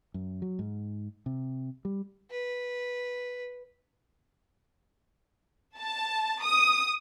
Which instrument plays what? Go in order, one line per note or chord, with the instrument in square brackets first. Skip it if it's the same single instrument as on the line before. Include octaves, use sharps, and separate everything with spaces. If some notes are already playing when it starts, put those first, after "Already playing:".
[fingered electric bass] F#2
F#3
G#2
C3
G3
[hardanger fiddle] B4
[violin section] A5
D#6